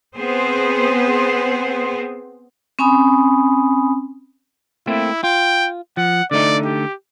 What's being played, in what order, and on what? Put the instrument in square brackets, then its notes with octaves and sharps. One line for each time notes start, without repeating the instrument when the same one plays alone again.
[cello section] B3 C4 G#4 C5
[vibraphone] C4 C#4 G#5 B5 D#6
[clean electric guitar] A3 A#3 C4 [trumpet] E4
[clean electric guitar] F4 [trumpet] G5
[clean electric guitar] F3 [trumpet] F#5
[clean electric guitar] D3 A3 D#4 [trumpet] D5
[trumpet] G4